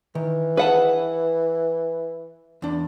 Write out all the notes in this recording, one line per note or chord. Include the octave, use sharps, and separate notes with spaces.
D#3 E3
G#4 B4 F#5 A5
E2 D4